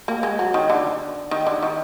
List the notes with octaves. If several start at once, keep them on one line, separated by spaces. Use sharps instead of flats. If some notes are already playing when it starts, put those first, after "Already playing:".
A#3
G#3
F#3
D#3
D3
D#3
D3
D#3